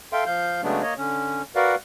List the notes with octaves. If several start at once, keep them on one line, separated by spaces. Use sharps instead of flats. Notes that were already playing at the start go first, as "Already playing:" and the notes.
A4 E5 F5 G5 C6
F3 F5 G6
C#3 F#3 G#3 A3 B3 D4
A#3 C#5 D#5
D3 C#4
F#4 A#4 B4 D5 F5 F#5